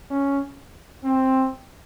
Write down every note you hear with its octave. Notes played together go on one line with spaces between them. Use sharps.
C#4
C4